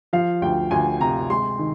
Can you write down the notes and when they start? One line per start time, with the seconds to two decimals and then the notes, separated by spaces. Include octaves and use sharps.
0.13 F3 F5
0.42 D2 G5
0.71 D2 G#5
1.00 C3 A#5
1.30 G#3 C6
1.59 D#3